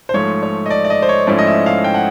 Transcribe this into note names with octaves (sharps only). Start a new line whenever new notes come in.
C5
G#2 F3 A3 C#5
C#5
D#5
D5
D5
D#5
C5
C#5
G#2 F3 A3 C#4 E4 D5
D#5
E5
F5
G5
F#5